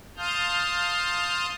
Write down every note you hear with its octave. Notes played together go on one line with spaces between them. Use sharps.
F5 A5 C6 D#6 F6 G6